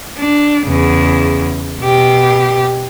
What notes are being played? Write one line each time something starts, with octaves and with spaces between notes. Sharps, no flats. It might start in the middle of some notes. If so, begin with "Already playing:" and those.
D4
E2 C#3
B2 G4